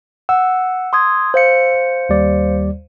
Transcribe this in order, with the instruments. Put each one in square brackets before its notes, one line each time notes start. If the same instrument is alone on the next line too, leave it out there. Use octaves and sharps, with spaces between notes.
[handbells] F#5 [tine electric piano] E6
[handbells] C6 D#6 G#6
C5 F5 C#7
[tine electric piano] D#2 G3 D5